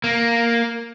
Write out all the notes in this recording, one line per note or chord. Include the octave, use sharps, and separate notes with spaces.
A#3